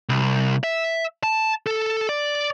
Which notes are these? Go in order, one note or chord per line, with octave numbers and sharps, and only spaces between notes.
C2
E5
A5
A4
D5